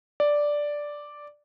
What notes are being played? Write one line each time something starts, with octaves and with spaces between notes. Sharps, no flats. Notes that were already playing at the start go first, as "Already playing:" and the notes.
D5